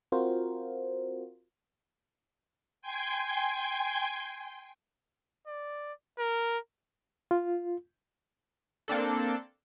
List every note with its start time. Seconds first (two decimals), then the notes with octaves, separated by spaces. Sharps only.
0.12 C4 F4 F#4 A#4 C5
2.81 G5 G#5 C6 G#6
5.47 D5
6.19 A#4
7.31 F4
8.88 A#3 C4 D4 A4